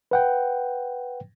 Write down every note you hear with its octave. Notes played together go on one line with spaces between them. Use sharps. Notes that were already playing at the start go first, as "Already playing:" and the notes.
B4 F#5 G5